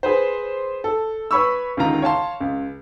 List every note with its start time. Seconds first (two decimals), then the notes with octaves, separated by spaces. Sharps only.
0.03 G#4 B4 C5
0.84 A4
1.31 B4 C#5 B5 C#6 E6
1.77 C#2 D3 D#3 F4 A#5
2.02 C#5 F5 A5 C6
2.41 C#2